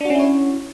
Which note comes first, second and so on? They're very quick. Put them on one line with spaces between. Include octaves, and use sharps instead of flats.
D4 F#4 C#4 E4 C#5